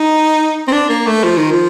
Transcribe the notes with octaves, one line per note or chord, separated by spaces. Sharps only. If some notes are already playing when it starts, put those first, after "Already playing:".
Already playing: D#4
C4
D4
A#3
A3
F3
D#3
F3